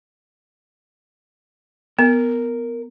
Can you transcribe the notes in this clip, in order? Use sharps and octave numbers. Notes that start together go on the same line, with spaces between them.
B3 A#4